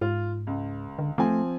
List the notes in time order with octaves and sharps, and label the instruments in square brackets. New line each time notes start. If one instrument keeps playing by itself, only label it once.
[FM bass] G#2 [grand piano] F4
[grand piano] C#2
[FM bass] D3
[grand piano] F3 C4 G#5 [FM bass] A3